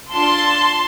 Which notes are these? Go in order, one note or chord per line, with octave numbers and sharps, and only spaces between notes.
D4 F4 A4 A5 C6